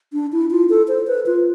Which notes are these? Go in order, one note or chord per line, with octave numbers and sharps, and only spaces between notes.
D4
E4
F4
A4
C5
B4
F4